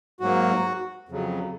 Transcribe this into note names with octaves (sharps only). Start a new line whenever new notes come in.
G#2 F#3 A#3 F#4
F2 C#3 F#3